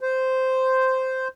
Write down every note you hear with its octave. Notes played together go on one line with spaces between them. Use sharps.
C5